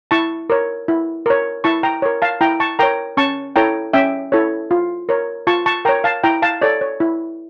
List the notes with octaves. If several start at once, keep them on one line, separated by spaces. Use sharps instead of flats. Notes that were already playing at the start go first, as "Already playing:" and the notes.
E4 A5 C#6
A#4 C#5
E4
A#4 C#5
E4 A5 C#6
G5 A#5
A#4 C#5
F5 A5
E4 G5 A#5
A5 C#6
A#4 C#5 G5 A#5
C#4 A5 C#6
E4 A4 C#5 G5 A#5
C#4 E5 G5
E4 A4 C#5
F4
A#4 C#5
F4 A5 C#6
A5 C#6
A#4 C#5 G5 A#5
F5 A5
E4 G5 A#5
F5 A5
A4 C#5 D5
C#5
E4